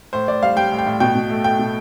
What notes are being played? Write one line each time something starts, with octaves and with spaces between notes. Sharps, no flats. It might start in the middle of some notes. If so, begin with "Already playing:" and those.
A2 C5
A2 D5
G3 F5
G3 G5
A2
G5
A2
B2 G5
B2
A3
A3 G5
B2